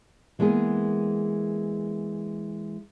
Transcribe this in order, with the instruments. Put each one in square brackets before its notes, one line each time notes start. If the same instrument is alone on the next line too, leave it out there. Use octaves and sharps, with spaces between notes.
[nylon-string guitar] E3 G#3 A#3 B3 G#4